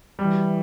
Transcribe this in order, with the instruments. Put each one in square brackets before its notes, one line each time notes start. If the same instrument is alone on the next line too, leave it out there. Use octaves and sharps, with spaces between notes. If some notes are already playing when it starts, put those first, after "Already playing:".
[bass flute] E3 [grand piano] G3